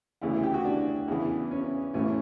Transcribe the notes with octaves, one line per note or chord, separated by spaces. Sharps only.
D2 C#3 E3 E4
G4
F#4
D4
E2 C#3 E3
C#4
A1 A2 E3 C#4